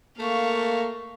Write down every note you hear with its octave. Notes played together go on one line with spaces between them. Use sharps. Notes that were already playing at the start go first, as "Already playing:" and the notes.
A3 A#3 F5 C#6